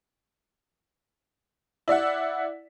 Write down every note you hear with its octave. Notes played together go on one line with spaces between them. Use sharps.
E4 D5 E5 F#5